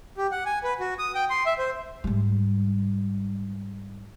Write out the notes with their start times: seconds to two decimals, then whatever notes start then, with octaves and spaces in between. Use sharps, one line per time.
0.18 G4
0.32 F#5
0.46 G#5
0.64 B4
0.80 F#4
0.99 D#6
1.15 G5
1.30 C6
1.46 E5
1.58 C5
2.04 G#2 G3